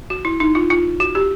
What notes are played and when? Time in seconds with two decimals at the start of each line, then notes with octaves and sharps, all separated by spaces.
0.10 F#4
0.25 E4
0.40 D#4
0.55 F4
0.70 F4
1.00 F#4
1.15 G4